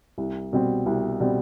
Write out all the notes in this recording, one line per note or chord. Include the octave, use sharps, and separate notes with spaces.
C2
B2 G3 C4
C2
B2 G3 C4